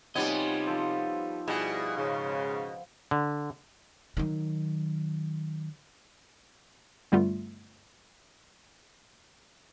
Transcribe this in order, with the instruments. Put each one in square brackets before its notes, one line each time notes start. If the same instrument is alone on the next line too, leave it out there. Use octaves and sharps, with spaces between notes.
[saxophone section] C3 F4 [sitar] G3 B3 [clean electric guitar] D#4 C#5 D#5 [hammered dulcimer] G#5
[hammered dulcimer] F3 A4 C5
[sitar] B2 [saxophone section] G3 E4 G#4
[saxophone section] G#2 C#3
[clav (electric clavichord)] D3
[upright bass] D#3 F#3
[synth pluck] G2 D3 G3 A3 B3 F4